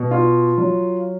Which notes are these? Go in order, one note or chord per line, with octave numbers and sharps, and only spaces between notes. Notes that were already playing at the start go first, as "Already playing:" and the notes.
Already playing: B2
F4
F#3